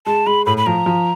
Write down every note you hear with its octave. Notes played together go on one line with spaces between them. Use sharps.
G#3 A5
G#3 B5
A2 B5
B5
F3 A#5
F3